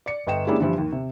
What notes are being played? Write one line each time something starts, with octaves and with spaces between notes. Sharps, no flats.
D5 C#7
G1 D#5 G5 E7
G#3 A#3 C#4 D4 E4 G4
G2 E3 F3 G3 E4
D#2
C3